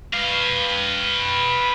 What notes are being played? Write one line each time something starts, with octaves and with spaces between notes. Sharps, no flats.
B4 F5